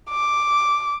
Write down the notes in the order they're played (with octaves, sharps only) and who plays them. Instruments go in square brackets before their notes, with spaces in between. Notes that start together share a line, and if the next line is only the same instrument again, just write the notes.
[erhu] D6